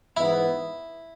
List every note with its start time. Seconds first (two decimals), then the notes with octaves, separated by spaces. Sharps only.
0.17 G#2 E3 B3 E4